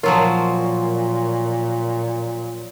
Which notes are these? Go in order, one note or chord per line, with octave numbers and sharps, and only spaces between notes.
A#2 F3 F#3 F4 A#4 C#5 C6 C#6